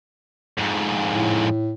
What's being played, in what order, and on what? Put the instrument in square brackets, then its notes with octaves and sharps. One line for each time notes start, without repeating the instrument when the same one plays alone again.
[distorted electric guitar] F2 G#2
[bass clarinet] A2